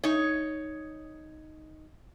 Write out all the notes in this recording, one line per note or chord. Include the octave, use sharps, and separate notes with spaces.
D#4 C#5